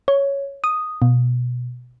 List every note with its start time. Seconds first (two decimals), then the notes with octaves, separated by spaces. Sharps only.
0.08 C#5
0.64 D#6
1.02 B2